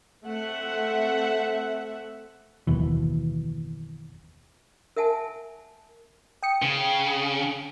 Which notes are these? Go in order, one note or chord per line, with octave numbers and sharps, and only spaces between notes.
A3 C4 E5 F#5
F#1 D#2 B2 E3
A#4 E5 F#5 G#5 A5
G5 D#6 C#7
C#3